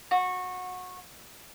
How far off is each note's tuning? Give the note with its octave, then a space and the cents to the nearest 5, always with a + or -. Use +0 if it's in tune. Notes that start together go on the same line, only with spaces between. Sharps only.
F#4 -20